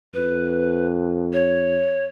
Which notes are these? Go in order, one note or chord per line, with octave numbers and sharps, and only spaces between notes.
F2 B4
C#5